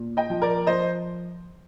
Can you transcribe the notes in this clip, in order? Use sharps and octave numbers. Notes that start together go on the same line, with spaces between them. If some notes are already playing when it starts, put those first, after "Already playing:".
Already playing: A#2
D#5 G5
F3
A#4 D5
F3 C5 D#5